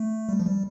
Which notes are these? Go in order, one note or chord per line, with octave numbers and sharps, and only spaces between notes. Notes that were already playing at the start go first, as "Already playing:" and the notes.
Already playing: A3
G3
F3
G3